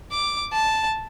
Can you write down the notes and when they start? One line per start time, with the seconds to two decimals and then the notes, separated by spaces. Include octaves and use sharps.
0.11 D6
0.53 A5